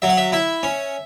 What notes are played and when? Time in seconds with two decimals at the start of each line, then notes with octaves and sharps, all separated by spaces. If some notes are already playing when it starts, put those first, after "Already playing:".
0.02 F#3 E5
0.09 F#5
0.17 E5
0.32 E4 E5
0.63 C#4